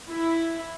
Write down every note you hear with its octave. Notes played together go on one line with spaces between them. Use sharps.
E4